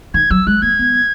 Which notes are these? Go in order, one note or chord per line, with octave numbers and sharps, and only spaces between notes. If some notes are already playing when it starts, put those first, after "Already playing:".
D#3 G#6
F#3 E6
G#3 F#6
A#3 G#6
B3